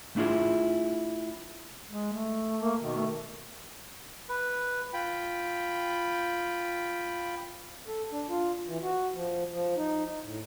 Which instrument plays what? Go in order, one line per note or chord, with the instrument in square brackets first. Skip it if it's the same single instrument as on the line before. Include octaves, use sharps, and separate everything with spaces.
[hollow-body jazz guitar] A3 D4 E4 F4 G#4
[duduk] G#3
A3
[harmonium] A#3
B2 D#3
[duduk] A3
[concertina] B4
[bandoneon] F4 G5 B5
[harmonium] A4
D4
F4
E3
F#4
F3
F3
D#4
D#4
A2